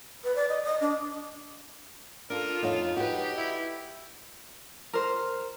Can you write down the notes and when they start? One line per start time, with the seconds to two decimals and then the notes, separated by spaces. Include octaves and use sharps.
0.24 B4
0.35 D5
0.49 D#5
0.63 D#5
0.81 D4
2.30 D4 F4 A4 A#4
2.63 F2 D#4 C#5 F5
2.97 F#4 G4 B4
3.37 E4
4.93 A#4 C5